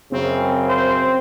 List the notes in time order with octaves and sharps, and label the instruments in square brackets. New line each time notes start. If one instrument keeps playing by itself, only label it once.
[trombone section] F#2 C#3 [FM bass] C4
[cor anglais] C5